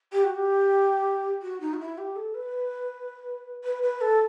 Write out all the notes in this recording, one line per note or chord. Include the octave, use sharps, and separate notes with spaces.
G4
F#4
G4
F#4
D#4
F#4
E4
G4
A4
B4
B4
B4
A4